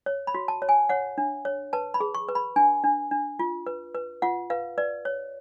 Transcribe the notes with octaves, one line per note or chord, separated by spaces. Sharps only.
C#5
B5
F#4
A5
C#5
G#5
C#5 F#5
D4
C#5
B4 A5
B5
G#4
C#6
B4
B5
D4 G#5
D4
D4
F4
B4
B4
F4 F#5
B4 F5
B4 D5
C#5